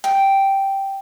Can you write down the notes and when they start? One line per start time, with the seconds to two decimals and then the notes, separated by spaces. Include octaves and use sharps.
0.04 G5